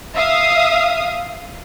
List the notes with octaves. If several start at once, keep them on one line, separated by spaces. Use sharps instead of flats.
E5 F5 D#6